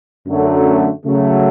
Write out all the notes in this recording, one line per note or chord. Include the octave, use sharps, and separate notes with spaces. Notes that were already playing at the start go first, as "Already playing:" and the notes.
F#2 D3 F#3 A3
C#3 F#3 A3